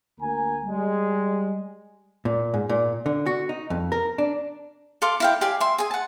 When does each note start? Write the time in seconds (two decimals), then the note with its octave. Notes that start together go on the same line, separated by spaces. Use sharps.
0.20 D2 A#3 G#5 A#5
0.64 G3 G#3
2.25 A#2
2.54 G#2
2.69 A#2
3.06 D3
3.26 F#4
3.49 D#4
3.70 F2
3.92 A#4
4.18 D4
5.02 A4 F5 C6 D6
5.20 E4 F5 G5
5.41 G4 D5 F5 G#5
5.60 E5 C6
5.78 G#4 G#5
5.91 F#5 A5